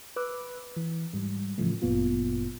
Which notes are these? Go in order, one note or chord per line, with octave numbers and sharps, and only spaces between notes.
B4 D6 E6 F#6
E3
G#2 G3
A2 C#3 E3 F3 A3
G1 F#2 A#2 B3 F4